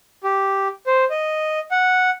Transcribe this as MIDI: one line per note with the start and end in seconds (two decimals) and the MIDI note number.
0.24 0.68 67
0.87 1.04 72
1.10 1.59 75
1.71 2.10 78